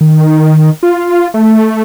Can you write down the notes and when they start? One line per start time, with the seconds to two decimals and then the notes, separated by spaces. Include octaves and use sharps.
0.01 D#3
0.83 F4
1.34 A3